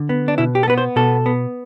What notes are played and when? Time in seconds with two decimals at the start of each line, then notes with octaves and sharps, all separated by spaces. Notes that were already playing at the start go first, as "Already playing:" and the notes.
Already playing: D3
0.09 B3
0.28 D4
0.38 B2 E4
0.55 G4
0.63 A4
0.68 B3 B4
0.78 C5
0.96 B2 A4
1.26 B3